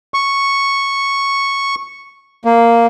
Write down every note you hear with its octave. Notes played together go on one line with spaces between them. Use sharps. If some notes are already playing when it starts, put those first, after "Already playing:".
C#6
A#3